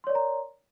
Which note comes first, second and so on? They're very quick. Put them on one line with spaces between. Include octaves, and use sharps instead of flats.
C6 C#5 D5 A#4 A#5